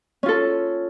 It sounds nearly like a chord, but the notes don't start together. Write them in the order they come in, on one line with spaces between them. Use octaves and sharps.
C#4 F4 A4